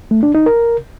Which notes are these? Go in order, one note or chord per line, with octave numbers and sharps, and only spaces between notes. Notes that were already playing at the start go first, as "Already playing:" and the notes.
A3
D4
D#4
A#4